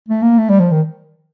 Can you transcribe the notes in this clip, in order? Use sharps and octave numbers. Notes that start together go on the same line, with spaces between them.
A3
A#3
A3
G3
F3
D#3